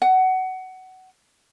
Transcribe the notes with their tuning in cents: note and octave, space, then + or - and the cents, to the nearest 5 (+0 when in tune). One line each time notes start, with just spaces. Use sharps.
F#5 +20